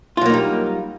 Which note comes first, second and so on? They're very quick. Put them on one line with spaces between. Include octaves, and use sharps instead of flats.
F4 F#3 A#3 D#4 G3